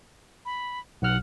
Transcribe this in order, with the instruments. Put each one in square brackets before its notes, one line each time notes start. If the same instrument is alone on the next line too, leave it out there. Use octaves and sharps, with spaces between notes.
[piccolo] B5
[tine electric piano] B1 F6 [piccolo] F#5